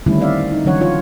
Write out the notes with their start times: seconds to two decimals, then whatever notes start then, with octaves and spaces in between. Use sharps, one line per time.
0.06 D3 D#3 G3 A3 C#4 E4
0.21 C4 D5 E5 F5
0.52 D#4
0.65 D3 E3 F#3 C#4 C#5 F#5
0.81 F4 C#5